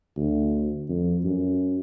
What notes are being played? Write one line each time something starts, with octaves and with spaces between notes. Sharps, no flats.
D2
F2
F#2